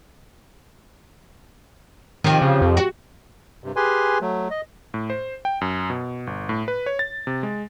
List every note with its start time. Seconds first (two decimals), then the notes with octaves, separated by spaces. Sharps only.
2.24 C3 D#3 F3
2.42 C#3
2.62 F2
2.77 F#4
3.64 G2 C3
3.76 G4 G#4 B4 G#5 C6
4.21 F#3 A3
4.51 D#5
4.94 A2
5.10 C5
5.45 G5
5.61 F#2
5.90 B2
6.27 G1
6.49 A2
6.68 B4
6.86 C#5
6.99 A6
7.27 C3
7.43 G#3